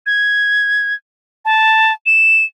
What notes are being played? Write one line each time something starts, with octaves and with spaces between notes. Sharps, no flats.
G#6
A5
E7